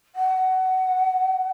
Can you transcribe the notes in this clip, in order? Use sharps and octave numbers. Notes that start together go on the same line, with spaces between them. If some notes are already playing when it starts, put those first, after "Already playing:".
F#5